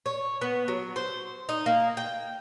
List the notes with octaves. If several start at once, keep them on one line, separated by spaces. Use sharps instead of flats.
C#5
B3
F#3
C5
D#4
A#3
G5